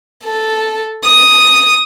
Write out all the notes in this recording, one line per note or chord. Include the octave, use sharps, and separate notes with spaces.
A4
D#6